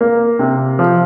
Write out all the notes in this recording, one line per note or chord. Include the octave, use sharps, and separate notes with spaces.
A#3
C3
F3